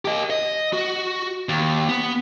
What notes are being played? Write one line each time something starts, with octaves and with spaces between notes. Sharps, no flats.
G4 D#5
D#5
F#4
D#2
B3